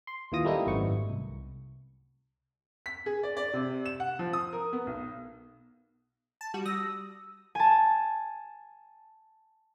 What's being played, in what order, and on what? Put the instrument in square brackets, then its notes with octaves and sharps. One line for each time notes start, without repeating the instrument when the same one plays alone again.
[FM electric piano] C6
D#2 A#2 E3 F4 D#6 A#6
G3 A3 A#3 C4 D#4 E4
G#1 F#2 A2 B3 C#6
C2
[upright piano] B6
G#4
D5
D5
C3
E7
F#5
F3
D#6
A#4
B3
B1
[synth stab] A5
G3 F#4
[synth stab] G3 D#6 A#6 [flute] E6
[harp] G#5 A5